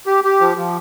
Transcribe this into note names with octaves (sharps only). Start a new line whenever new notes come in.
G4
G4
F3
F3